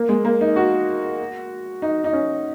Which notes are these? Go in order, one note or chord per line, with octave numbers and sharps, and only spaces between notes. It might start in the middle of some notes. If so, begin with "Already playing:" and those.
Already playing: A#3
G#3
A#3
D#4
F#4
D#4
D#4
C#4